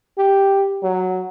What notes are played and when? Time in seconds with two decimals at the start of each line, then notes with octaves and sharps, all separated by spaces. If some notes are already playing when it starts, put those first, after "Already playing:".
0.18 G4
0.83 F#3